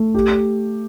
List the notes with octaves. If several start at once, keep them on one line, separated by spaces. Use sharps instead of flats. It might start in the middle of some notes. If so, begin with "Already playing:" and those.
Already playing: A3
G4